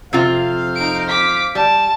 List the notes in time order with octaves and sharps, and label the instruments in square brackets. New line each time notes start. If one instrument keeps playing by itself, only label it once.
[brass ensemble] F2 C5 F5 [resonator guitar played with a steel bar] C3 F4
[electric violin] D#4 D7
D6 B6
[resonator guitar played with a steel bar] G3 [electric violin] A5